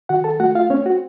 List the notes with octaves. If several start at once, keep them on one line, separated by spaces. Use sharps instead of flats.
D#3 F#4 F#5
A4 A5
A3 F#4 F#5
F4 F5
C4 C#4 C#5
F#4